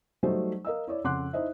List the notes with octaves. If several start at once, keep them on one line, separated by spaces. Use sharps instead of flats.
F#3 G3 A3 D#4 C5
A#4 D#5 F5 E6
E4 C#5 D5
F2 C#3 F#5 C6 D6 F#6
D#4 E4 C5 D#5 E5